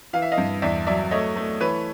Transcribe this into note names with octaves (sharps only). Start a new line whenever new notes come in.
E3 F5
E5
D#5 F5
G2
E2 D5 E5
F#3 D5 E5
A3 C#5 D#5
A3
E3 B4 C#5